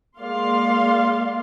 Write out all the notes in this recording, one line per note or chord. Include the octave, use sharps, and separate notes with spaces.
G#3 A#3 D5 F5 C6